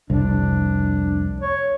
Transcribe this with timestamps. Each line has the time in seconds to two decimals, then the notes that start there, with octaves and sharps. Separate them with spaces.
0.10 F1 C2 D4
1.41 C#5